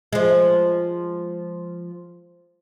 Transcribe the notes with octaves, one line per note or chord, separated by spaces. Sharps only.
F3 G#3